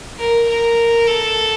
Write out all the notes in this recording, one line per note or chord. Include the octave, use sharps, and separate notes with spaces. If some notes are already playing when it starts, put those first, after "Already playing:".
A#4
A#4
A4